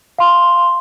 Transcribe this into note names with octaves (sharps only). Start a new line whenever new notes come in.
F5 C6